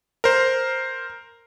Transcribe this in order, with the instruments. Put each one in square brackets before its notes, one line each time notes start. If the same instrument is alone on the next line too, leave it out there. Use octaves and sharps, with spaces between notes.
[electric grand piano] A#4 C5